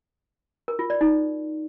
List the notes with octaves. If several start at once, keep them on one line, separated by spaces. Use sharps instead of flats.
A#4
F4
D5
D#4